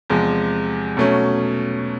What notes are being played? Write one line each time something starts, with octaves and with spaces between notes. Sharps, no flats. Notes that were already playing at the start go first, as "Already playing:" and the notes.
E2 C3 F3 G#3
B2 F#3 A3 C#4